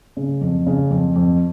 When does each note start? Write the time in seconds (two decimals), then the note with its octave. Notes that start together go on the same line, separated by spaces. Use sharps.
0.17 C#3
0.41 F2
0.67 C#3
0.90 F2
1.16 F2